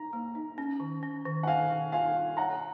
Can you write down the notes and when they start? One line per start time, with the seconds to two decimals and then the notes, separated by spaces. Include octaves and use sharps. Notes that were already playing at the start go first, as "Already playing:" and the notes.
Already playing: D#4 A#5
0.13 A#3
0.35 D#4
0.58 C#4
0.80 D#3
1.03 C#4
1.25 D#3
1.43 F#5
1.47 D#3 F5 G#5
1.71 D#3
1.92 F4 F5 G#5
2.15 F4
2.37 C#5 F#5 A#5